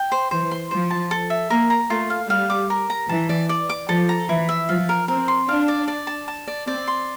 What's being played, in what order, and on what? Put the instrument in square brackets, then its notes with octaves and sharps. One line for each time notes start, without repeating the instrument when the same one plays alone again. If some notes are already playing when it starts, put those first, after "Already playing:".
Already playing: [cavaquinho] G5
C5
[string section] E3 [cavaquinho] C5
[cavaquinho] C6
[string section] F3 [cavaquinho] C5
[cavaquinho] A5
A4
E5
[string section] A#3 [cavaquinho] A#4
[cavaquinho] A#5
[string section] A3 [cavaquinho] F4
[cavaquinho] F5
[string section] G3 [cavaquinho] F5
[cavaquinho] D6
A#4
A#5
[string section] E3 [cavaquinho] A5
[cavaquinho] D5
D5
D6
[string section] F3 [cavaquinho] A4
[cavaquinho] A#5
[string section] E3 [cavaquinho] E4
[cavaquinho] E5
[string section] F3 [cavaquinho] F5
[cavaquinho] A#4
[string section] C4 [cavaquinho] A#4
[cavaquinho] C6
[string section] D4 [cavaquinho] F5
[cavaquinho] D5
D5
A5
A5
D5
[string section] C4 [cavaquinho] D5
[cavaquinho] C6